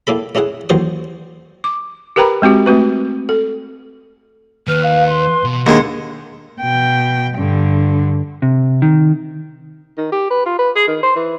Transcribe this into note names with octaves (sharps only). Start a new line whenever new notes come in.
A2 A#3 A4 B5
A3 C#4 E4 G#4 F#5
A1 D#2 F#3 C5 C#6 D#6
D6
G4 A#4 B4 G5 A#5 B5
G#3 C4 F#4 G4
A3 C4 F#4 B4
A4
D#2 B4 F6
F5
C6
B2
D#2 G#3 D4 F#5 C6
B2 G5
G2 D3
C3
D#3
D#3
G4
B4
F4
B4
G#4
D#3
C5
E3